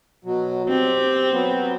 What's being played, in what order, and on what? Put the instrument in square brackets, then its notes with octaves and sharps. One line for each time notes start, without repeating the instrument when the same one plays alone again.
[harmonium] B2 F#3
[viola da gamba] C4 [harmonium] G4
[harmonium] F#3 B3